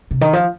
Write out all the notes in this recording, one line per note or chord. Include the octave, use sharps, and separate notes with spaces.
C3
D#3
F3